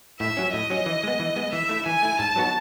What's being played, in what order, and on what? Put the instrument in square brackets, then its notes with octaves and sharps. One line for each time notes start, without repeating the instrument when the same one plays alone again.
[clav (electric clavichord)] A2 [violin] E5
[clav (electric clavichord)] F#3 C#4
[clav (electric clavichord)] A2 [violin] D#5
[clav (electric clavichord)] F#3 C#4
E3
G#3 B3
E3
G#3 B3
[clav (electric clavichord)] E3 [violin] E5
[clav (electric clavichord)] A3 E4
[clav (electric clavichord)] E3 [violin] G#5
[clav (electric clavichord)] A3 E4
[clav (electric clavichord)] G#2 [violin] A5
[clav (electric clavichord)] F#3 B3 D#4 F#4